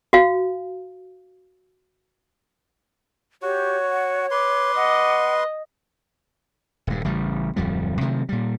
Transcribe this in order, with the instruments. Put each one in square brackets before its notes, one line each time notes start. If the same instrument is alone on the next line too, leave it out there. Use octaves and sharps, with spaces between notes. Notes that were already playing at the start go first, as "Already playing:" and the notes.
[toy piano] F#4 F5
[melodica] F#4 [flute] G4 [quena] C#5
[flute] F#5
[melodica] B4 C6 [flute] D6
[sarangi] D#5 [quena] F#5
[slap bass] D#1 G2
A1 C#3 G3
D1 F2 F3 G3
C3 D#3 F#3 A3
A#2 G3